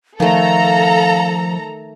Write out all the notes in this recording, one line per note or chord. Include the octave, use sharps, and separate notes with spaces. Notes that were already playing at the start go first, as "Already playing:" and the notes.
D#3 F3 A3 A4 F5 A#5